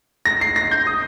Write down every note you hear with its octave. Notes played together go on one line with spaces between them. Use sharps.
A#6
C7
A#6
G6
D#6